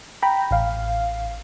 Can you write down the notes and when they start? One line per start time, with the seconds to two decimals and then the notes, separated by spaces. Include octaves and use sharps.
0.23 G5 A#5 B5
0.51 A1 F5